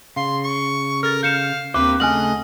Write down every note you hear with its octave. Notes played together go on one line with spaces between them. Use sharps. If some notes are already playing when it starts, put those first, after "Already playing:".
C#3 F5 C6
C#6
A4 A#4 F6 A6
F5 G6 C#7 E7
D#2 A#3 C4 G4 B4 C5 D6
C#3 A3 D#5 F#5 G#5 F6 F#7